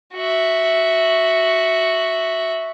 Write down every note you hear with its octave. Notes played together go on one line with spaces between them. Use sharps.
F#4 E5